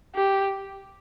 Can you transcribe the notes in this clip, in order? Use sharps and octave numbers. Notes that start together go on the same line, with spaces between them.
G4